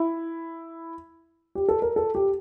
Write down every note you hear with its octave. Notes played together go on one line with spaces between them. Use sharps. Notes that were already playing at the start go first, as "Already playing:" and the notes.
Already playing: E4
G4
A4
A#4
A4
G4